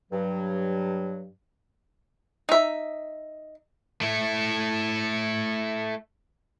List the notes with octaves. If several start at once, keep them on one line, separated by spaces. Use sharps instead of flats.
G2 F#3
D#4 E5
A3 E4